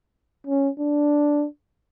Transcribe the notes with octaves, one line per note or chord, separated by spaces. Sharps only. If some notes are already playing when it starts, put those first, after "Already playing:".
C#4
D4